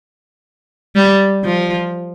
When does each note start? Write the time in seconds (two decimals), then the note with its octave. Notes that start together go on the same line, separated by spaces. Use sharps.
0.96 G3
1.44 F3